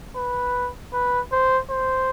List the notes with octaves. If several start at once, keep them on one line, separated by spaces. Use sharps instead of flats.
B4
B4
C5
C5